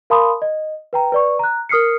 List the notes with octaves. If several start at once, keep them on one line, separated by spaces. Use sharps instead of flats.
A#4 F5 A5 B5 C6 D#6
D#5
B4 G5 A#5
B4 D5 C#6
A#5 F#6
A#4 D#6 F6 C7 C#7